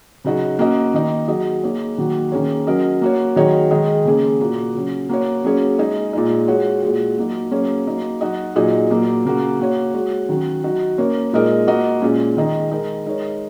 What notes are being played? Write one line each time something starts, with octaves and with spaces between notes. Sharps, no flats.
C#3 F#3 D#4 F#4
A#3 C#4 F#4 D#5
D#3 A#3 D#4
F#3 D#4 G#4 D#5
A#3 D#4 G#4 C#5
D#3 F#3 A#3 D#4 F#4
D#3 A#3 C#4 G#4 C#5
F#3 C#4 A#4 D#5
A#3 F#4 C#5
D#3 F#3 D#4 G#4 C#5
D#3 G#3 D#4 G#4 D#5
C#3 A#3 C#4 G#4
A#2 A#3 F#4
C#3 F#3 C#4
A#3 F#4 C#5
F#3 A#3 C#4 G#4 C#5
G#3 D#4 G#4
A#2 G#3 D#4
G#3 F#4 C#5
A#2 G#3 F#4
F#3 A#3 D#4
F#3 A#3 C#4 G#4 C#5
F#3 A#3 D#4
F#3 D#4 F#4 D#5
A#2 F#3 D#4 G#4
A#2 F#3 A#3
C#3 A#3 C#4 F#4
A#3 F#4 C#5
G#3 F#4 C#5
D#3 F#3 C#4 F#4
F#3 D#4 F#4
A#3 C#4 A#4 C#5
A#2 G#3 D#4 A#4 D#5
A#3 F#4 D#5
A#2 G#3 C#4
D#3 G#3 D#4 G#4 D#5
G#3 D#4 A#4
G#3 D#4 A#4 C#5